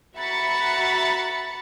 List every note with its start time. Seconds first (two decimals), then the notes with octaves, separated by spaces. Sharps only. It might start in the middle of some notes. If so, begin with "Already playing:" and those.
0.17 F#4 E5 A#5 B5 A6 C#7